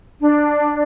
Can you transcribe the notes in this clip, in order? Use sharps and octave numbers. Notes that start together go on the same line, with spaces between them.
D4